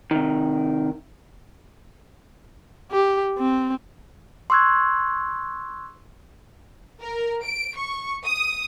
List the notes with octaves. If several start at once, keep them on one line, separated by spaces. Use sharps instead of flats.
C3 D#3
G4
C4
C6 C#6 E6 F#6 G#6
A#4
D7
C#6
D#6